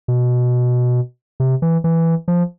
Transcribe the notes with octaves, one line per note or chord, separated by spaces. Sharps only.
B2
C3
E3
E3
F3